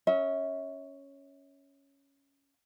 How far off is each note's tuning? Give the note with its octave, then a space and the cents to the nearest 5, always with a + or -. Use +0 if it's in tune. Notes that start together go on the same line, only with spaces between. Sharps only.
C#4 +0 E5 -35